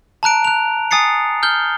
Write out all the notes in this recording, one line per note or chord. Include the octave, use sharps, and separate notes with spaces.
A5 A#5 F#6 D7
F#6 F7
G#5 D#6 A6 C7 C#7
F6 G6 G7